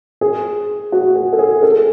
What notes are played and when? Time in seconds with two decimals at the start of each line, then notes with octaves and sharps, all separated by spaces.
0.21 G#4
0.92 F#4
1.16 G#4
1.33 A4
1.39 G#4
1.63 A4